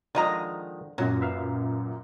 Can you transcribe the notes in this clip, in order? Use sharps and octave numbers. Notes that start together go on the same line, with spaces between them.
D3 D#3 F3 G#3 D#5 A#5
F#2 A#2 F#3 C#4
B4 E5 F5